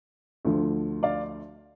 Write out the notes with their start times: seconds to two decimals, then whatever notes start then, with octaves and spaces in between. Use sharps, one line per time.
0.45 D2 D3 F3
1.03 D5 F5